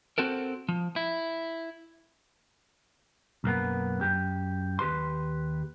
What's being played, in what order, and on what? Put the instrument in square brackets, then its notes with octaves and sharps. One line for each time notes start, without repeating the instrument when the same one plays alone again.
[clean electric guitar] C4 F#4 A4 A#4
F3
E4
B1 F#2 A#3 B3
F#2 G4
D#2 G4 B4 C6